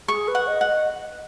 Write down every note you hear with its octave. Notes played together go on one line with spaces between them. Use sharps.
G#4 C#6
B4
F#5
D#5
F#5
D#5